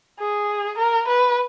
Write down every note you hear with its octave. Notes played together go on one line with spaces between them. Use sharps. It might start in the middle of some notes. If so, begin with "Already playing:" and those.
G#4
A#4
B4